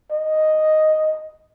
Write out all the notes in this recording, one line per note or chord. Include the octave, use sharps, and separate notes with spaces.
D#5